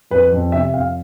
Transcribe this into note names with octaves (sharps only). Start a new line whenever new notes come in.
F2 B4
F2
C3 E5
F2 F5